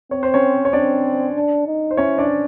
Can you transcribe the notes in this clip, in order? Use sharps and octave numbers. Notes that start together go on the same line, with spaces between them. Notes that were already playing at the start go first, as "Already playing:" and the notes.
C4 C#5
C5
C#4 C#5
C#5
C4 D4 D5
D4
D#4
C5
C#4 E4 C#5
D4 D5